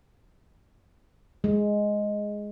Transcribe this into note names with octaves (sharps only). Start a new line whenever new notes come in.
G#3